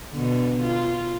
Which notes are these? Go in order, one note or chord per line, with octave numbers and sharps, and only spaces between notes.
B2 D3
F4